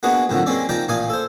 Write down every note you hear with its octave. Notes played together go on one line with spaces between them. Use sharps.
A#3 B3 D4 F#4 G#4 B4
F2 A2 D3 D#3 F3 F#3
G#3 A#3 C4 C#4 D5
D#3 F3 D5 G5 A#5
A1 A#2 D5 F5 G#5 D#6
A4 C5